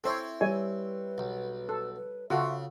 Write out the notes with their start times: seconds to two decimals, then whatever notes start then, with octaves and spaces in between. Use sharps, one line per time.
0.04 C4 E4 A4 C5 C#5
0.41 G3 B4 C#5 G#5
1.18 B1
1.69 A4
1.95 B4
2.30 C#3 F4 F#4 A4 E5